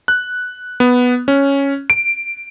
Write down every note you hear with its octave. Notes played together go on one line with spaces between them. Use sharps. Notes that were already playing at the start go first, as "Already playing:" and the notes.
F#6
B3
C#4
D7